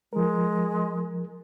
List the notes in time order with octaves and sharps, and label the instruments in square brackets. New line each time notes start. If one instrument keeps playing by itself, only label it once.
[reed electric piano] F3 A#4 [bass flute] G#3